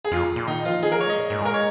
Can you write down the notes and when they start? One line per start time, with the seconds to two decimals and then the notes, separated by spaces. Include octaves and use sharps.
0.05 G#4
0.11 F2 F4
0.36 A#2
0.47 D#3 D#4
0.65 F3 F4
0.83 D#3 G#4
0.92 F3 A#4
1.00 C#5
1.07 G#3 D#5
1.18 A#2
1.30 G#2
1.42 G#3 A#4
1.54 C#5